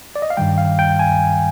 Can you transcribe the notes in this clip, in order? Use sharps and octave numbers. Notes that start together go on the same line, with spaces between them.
D5
D#5
F5
G2 D#3 G3 G5
F5
G5
G#5